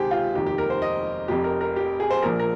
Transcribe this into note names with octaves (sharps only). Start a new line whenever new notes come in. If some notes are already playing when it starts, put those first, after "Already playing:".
Already playing: C#2 C3 D#3 G4 G#4 C5
F4
F1 D#2 D#3 G4
G4
A#4
C5
D#5
F1 F2 C3 G4
A#4
A#4
G4
G#4
C5
A#1 A#2 F3 A#4
A#4